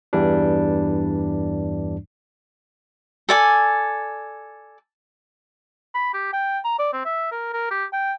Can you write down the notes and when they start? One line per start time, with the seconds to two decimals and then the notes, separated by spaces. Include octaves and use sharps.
0.13 E2 G2 E3 G3 D4
3.29 A4 D5 G#5
5.95 B5
6.14 G4
6.33 G5
6.65 A#5
6.79 D5
6.93 C4
7.05 E5
7.31 A#4
7.53 A#4
7.71 G4
7.93 G5